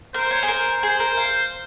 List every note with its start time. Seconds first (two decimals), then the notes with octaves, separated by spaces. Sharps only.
0.14 A#4 C5
0.31 C#5
0.43 G#4
0.48 A#4
0.82 G#4 C5
1.00 A#4
1.17 F5